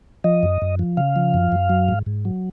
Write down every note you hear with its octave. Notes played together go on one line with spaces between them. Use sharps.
F3 D#5
F#2
F#2
F3
C#3 F5
F3
F#2
F#2
F#3
G#2
G#2
F#3